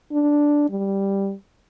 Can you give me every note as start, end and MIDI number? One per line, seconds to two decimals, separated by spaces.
0.12 0.66 62
0.70 1.34 55